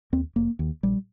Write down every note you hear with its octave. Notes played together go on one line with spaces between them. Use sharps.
D#2 C4
F1 A#3
D#2
A#1 G3